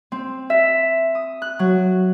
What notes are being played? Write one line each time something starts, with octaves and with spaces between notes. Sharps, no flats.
C4
E5
D#6
F#6
F#3